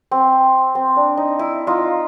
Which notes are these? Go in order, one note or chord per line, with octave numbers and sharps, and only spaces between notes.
C4
C4
D4
D#4
E4
D#4 F4